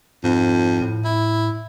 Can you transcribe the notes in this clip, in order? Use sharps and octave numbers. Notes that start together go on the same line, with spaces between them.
F2 G#2
A2
E4